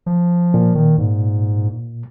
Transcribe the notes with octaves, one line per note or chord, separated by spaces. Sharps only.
F3
A#2
D#3
G#2